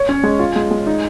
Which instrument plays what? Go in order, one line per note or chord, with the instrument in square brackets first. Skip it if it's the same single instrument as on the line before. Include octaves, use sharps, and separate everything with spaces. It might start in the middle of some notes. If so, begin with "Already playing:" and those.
Already playing: [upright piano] C#5
C#4
G#3
F4
G#3
G#3
D#4